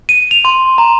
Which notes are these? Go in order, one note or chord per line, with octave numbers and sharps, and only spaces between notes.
D#7
F7
C6
A#5